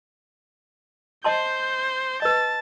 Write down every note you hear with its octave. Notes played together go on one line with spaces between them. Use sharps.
C5 D#5 A5 C6 G6
B4 D#5 A5